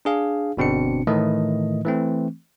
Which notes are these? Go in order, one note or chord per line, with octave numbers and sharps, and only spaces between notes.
D4 G#4 F5
G1 B2 C4 D4 C#7
A2 D#3 E3 A3 D#5
E3 A3 C4